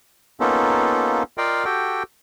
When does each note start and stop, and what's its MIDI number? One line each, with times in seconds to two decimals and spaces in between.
0.40 1.23 58
0.40 1.23 59
0.40 1.23 61
0.40 1.23 63
0.40 1.23 65
0.40 1.23 69
1.38 1.65 65
1.38 1.65 70
1.38 1.65 74
1.38 1.65 75
1.38 1.65 77
1.38 1.65 79
1.65 2.03 66
1.65 2.03 67
1.65 2.03 69
1.65 2.03 79